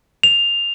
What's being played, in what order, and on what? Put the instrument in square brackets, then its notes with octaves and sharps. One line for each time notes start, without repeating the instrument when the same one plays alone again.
[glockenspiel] F7